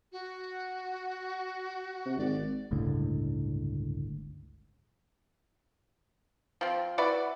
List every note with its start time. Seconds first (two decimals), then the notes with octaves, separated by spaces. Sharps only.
0.12 F#4
2.06 C3
2.18 G#1 D5
2.71 G1 C#2 A2 D3
6.61 F3 C4
6.98 E4 F#4 B4 D5